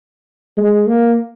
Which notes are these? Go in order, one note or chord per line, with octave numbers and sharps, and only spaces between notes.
G#3
A#3